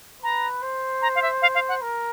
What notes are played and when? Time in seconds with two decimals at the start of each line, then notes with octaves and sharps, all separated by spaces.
0.22 B4 A#5
0.62 C5
1.02 A#5
1.16 F5
1.22 E5
1.42 F5
1.55 F5
1.68 F#5
1.82 A#4